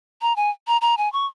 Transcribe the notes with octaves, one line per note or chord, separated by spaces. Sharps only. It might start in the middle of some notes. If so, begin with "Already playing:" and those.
A#5
G#5
A#5
A#5
G#5
C#6